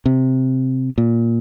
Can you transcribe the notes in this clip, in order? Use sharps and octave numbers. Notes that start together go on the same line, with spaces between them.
C3
A#2